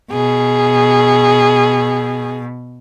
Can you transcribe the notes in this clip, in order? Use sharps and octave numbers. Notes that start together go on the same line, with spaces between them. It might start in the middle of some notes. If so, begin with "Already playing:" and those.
B2 G#4